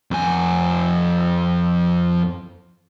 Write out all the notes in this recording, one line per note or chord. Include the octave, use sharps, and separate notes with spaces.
F2 G#5